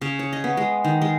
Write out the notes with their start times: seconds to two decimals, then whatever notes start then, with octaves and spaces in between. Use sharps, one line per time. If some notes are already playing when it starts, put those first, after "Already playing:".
0.01 C#3
0.19 C#5
0.33 D#5
0.44 B3
0.57 G#3
0.84 D#3
1.01 G#3